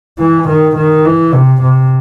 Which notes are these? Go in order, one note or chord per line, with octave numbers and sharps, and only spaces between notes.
E3
D#3
D#3
E3
C3
C3